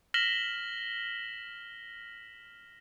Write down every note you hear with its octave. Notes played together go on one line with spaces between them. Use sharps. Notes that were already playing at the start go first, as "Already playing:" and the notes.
F6 A#6 B6 E7 F#7 G7